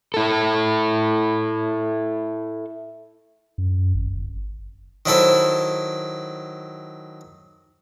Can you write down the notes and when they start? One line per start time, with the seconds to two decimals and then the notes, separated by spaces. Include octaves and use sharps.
0.14 E4 A4
3.58 F#2
3.94 G#1
4.15 G1
5.06 D#3 F#3 E4 A4 C5